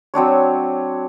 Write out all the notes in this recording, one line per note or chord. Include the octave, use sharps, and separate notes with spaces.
F#3 C4 D4 C#5